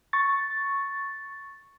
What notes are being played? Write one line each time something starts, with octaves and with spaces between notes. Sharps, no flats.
C#6 A6